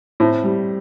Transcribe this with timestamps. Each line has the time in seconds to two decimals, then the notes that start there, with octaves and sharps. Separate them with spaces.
0.20 A2 C4
0.44 G3